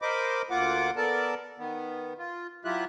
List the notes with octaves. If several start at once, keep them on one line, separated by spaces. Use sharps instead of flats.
A#4 C5 D#5 B5 D6
D2 A#3 F4 F#5 D6
B3 A4 A#4 D5 A5
D#3 B3
F4
F#3 E4 F4 G4 E5 F#6